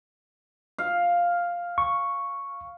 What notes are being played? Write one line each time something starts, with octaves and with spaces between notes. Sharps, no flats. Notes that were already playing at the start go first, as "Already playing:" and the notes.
F5
C#6